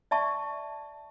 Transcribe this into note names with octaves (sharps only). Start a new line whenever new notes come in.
D5 E5 A5 C#6